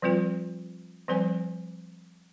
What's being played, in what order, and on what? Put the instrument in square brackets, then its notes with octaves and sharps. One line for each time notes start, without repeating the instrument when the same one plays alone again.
[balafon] F3 G3 C4 F4 B4
F3 G3 C4 C5 G#5